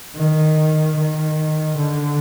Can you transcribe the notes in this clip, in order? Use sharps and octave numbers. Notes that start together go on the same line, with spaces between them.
D#3
D#3
D3